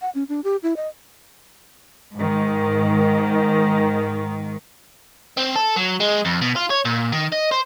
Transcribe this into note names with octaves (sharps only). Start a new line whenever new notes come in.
F#5
C#4
D4
G4
E4
D#5
G#2 D#3
C4
A4
F#3
G#3
F2
B2
F4
C#5
A#2
D#3
D#5
C5